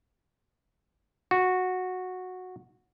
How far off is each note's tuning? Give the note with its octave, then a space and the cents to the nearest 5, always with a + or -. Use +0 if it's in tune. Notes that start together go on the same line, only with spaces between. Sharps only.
F#4 -10